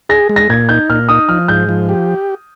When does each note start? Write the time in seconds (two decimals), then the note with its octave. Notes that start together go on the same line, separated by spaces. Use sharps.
0.09 G#4 A#6
0.29 G#3
0.36 A#6
0.50 A#2 G#6
0.69 D#4 G6
0.90 A#2 F6
1.09 D#4 D#6
1.29 F3 F6
1.48 G#2 G6
1.69 F3
1.89 G4